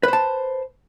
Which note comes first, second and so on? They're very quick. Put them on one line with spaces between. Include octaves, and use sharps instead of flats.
B4 C5 A5